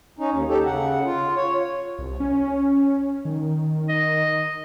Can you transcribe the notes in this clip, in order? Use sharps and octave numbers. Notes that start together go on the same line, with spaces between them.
C#4 D#4
D#2
D#4 G4 A4
C#3 F#5
F4
C#5
C2
C#4
D#3
D#5